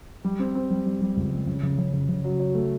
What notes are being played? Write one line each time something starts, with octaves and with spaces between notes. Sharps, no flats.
G3
C4
C4
G3
G3
G3
C#2
G3
C#3
C#3
C#3
C#3
C#3
F#3
F#3
A3